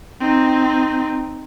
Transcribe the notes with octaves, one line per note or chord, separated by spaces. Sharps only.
C4 D#4